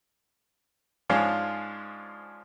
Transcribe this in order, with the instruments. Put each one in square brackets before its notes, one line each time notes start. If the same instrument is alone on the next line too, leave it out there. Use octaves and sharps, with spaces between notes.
[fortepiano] G#2 F3 G#3 C#4 D4 F4